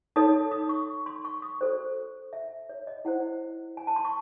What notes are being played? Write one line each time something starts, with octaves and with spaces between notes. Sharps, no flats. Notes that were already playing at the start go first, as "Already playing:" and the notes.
D#4 A4 C#5 D#6
D#6
C#6
C6
C#6
D#6
F#4 A4 C5
E5
C#5
D#5
E4 C5 F#5
G#5
A5
C6
C#6